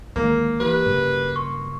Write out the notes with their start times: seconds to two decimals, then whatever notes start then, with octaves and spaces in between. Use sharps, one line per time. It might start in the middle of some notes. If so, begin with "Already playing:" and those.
0.16 D2 D#3 G#3 A#3
0.60 E3 G4 B4
0.86 G2 C#3 F#3
1.36 C6 C#6